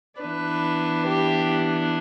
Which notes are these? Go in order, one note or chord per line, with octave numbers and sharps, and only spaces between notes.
E3 B3 D4 B4
G4